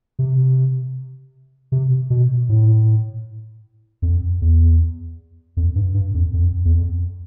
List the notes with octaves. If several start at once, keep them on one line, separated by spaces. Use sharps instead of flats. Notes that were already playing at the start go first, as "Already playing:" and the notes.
C3
C3
B2
A2
F2
E2
F2
G2
G2
F2
F2
E2
F2